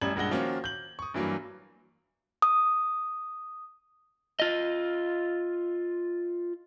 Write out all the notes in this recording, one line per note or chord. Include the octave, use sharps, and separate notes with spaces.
A1 F#2 G3 G#6 F#7
A#1 G2 G#3 F#5 A#6 G7
D#3 F3 A#3 C#4 F4 F#4
G6 F#7
C#6 D#6
G2 E3 F#3 A#3
D#6
F4 D#5